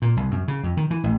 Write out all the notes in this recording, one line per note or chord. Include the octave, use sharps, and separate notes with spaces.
A#2
C2
F#2
C#3
F2
D#3
E3
A1